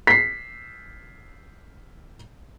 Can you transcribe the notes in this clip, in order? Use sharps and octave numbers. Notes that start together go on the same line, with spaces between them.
B6 C7